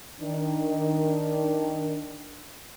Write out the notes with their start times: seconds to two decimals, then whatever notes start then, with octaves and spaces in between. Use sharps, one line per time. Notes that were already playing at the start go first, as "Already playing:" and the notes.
0.20 D#3 D4